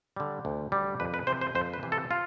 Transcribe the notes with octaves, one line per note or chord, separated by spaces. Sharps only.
D3 G3
D2
D3 G3
F2 B4
B4
C3 E3 C5
C5
F2 C5
B4
C3 E3
A4
F4